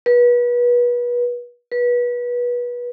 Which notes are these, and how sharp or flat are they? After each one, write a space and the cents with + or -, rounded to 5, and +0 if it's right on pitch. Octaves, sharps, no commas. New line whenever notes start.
B4 -30
B4 -25